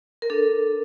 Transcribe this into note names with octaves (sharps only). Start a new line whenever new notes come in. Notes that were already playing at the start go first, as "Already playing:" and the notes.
A#4
D4 A4